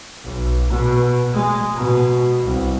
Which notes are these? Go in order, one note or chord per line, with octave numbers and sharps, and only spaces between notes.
B1
B2
G#3
B2
C2